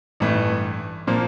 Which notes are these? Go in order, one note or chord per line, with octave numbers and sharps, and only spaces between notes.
A1 G2 E3 A3
A#2 F3 A#3